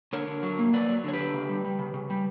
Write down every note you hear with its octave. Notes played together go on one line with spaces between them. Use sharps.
D3 A#4 C#5
D3
F#3
A#3
F#3 B4 D5
F#3
D3 C#5
G4 B4
D3
C#3
G3
G3
C#3
C#3
G3